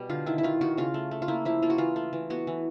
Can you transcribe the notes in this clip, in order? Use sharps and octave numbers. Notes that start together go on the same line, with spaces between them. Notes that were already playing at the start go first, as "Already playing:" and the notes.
Already playing: B2 G3
D3 F4
D#3 E4
E4
D#3 F4
D#3 F#4
C#3 F4
A3
A3
F4
A#3 E4
F3 E4
A#3 F4
F#4
E3 F4
A3
E3
B3 F#4
E3